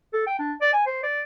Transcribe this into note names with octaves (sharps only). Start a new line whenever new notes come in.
A4
G5
D4
D5
G#5
C5
D5